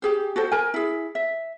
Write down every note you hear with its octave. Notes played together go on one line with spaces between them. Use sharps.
G4 G#4 C5
F#4 A4 C5
A#4 G#5
E4 G#4
E5